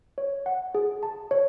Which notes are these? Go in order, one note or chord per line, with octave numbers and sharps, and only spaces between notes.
C#5
F#5
G#4
A5
C#5